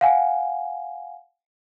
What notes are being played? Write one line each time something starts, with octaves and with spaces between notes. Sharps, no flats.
F5 F#5 G#5